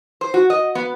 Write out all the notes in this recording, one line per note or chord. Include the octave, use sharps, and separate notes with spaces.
C5
F#4
D#5
B3